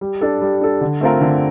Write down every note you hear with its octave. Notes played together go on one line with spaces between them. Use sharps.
G3
D4 A4
G3
D4 A4
D3
A3 C4 F4 A#4
D3